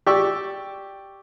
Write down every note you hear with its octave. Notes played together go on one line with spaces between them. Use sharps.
G4 D5 C#6 E6